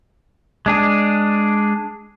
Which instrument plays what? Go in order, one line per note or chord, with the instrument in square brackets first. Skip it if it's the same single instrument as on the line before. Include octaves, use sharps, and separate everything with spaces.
[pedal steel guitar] G#3 D4 G#4